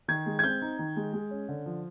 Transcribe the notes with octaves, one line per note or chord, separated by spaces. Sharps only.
D#3 G#6
G#3
G#6
C4 G6
D#4
D#3
G#3
G#3
C#4
D3
F3